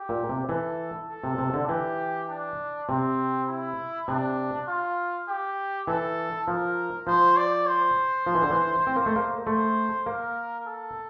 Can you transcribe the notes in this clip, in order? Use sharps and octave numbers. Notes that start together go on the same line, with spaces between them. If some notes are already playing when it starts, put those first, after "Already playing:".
Already playing: G4
A#2
C3
E3 A4
A4
C3
C3
D3
E3 G4
D4
C3 C4
E4
C3 D4
F4
G4
E3 A4
F3 A#4
F3 C5
D5
C5
F3
E3
D3
E3
C4
A#3
A3
A#3
A3 C5
A#3 A#4
A4